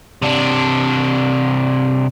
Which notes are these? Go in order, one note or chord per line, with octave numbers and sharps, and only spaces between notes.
C3 D4